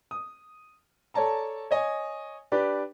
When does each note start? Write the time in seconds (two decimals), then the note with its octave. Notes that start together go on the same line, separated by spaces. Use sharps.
0.11 D#6
1.14 A4 C#5 D5 A5 A#5
1.71 C#5 D#5 G#5
2.52 D4 G4 B4 D5